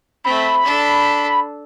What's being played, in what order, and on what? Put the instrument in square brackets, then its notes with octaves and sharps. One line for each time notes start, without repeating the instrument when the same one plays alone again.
[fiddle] A3 C4 [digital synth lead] B5
[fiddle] D4 A4